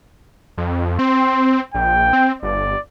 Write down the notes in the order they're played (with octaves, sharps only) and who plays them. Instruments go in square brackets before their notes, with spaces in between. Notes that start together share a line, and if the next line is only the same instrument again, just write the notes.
[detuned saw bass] F2
[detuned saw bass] C4 [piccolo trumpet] C6
[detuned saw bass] A#1 [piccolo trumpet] G5
[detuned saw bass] C4
[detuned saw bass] G1 [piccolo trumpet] D5